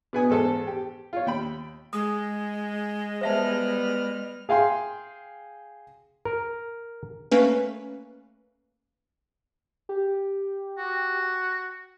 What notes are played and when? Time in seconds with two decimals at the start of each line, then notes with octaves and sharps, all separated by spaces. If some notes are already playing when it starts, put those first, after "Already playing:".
0.13 B2 B3 G#5 D#6
0.29 E2 G#2 A4 A5
0.67 G4
1.13 F4 C#5
1.26 D#2 G5 B5
1.93 G#3 D#6
3.21 G3 B3 C5 E5 A5 F6
4.49 G#4 F5 G5 C6
6.25 A#4
7.31 A3 A#3 C#4 B4
9.89 G4
10.78 F#4